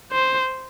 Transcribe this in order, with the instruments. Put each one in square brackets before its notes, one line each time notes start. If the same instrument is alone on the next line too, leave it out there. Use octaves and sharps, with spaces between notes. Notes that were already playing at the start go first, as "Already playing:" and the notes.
[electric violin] C5